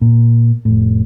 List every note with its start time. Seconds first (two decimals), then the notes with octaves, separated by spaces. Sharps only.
0.01 A#2
0.65 F1 A2